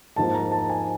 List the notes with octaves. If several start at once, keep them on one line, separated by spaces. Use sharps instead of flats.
G#2 F3 A#3 A5
A#5
A5
G#5